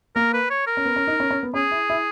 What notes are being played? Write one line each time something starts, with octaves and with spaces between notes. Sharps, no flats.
A#3 A#4
B4
C#5
A#4
C#4
B3
C#4
D#4
C#4
C#4
B3
C#4 G#4
E4
E4